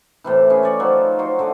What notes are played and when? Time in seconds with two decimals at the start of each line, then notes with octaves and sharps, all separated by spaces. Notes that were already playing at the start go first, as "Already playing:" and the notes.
0.24 A2 C3 E3
0.50 C#4 G#4 B4
0.63 C#5 D5
0.80 F3 F#3 D#4 F4
1.19 F#3 D#4 F#4 C5
1.39 D3 A3 D6